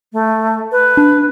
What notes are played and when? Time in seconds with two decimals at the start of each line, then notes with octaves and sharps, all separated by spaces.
0.13 A3
0.72 B4
0.97 D4